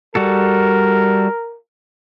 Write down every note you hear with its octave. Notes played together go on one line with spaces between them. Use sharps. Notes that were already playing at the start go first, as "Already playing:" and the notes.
G3 F#4 A4 A#4